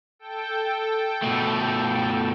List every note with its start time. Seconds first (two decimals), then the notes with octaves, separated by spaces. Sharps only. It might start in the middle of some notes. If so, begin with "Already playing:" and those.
0.19 A4 G5
1.22 B2 A3